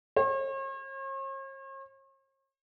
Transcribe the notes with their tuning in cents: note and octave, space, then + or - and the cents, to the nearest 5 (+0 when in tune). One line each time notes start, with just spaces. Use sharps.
C#5 -45